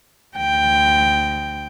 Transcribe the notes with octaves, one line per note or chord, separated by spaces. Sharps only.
D2 G5